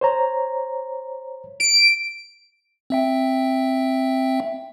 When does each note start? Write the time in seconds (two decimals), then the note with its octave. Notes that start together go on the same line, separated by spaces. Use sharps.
0.01 C5 C#5 A#5
1.60 D7
2.90 C4 E5 G5